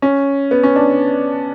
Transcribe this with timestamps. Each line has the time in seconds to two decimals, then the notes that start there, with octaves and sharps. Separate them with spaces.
0.02 C#4
0.51 B3
0.63 C#4
0.76 D4